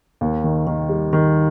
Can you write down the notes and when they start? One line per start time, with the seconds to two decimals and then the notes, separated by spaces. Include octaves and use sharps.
0.21 D#2
0.44 D#3
0.67 D#3
0.89 G3
1.13 D#3